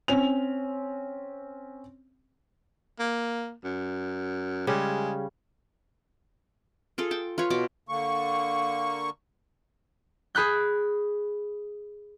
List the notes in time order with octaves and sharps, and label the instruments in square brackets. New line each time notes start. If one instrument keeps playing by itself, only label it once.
[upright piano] C4 C#4 F7
[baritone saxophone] A#3
F#2
[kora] C#3 G3 C#4 [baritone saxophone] G#3
[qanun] F4 G#4 A4
G5 A5
F4 B4 C#5
B2 C#5 D6
[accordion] D3 A#3 C#6
[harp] G#4 B5 F#6 G6